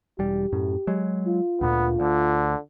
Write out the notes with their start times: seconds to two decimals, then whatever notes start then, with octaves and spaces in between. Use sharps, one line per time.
0.19 E1 G3 G4
0.53 F#2 A2
0.87 F#3 G#3
1.27 F4
1.61 D2 A#2 D3 B3
2.00 D2 D3